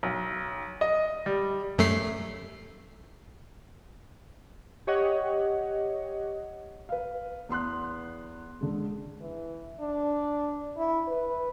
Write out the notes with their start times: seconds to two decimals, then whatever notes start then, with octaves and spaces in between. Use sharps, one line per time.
0.03 B1
0.81 D#5
1.26 G3
1.78 F#2 A3 C7
4.87 G4 C#5 D#5 F#5
6.89 B4 F5
7.49 E2 B3 C6 F#6
8.61 D3 G#3
9.21 E3
9.80 D4
10.77 E4
11.08 B4